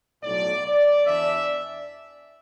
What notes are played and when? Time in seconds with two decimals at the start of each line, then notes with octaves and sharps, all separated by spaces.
0.23 B1 A2 F#3 D5
0.65 D5
1.06 E2 E3 D4 E5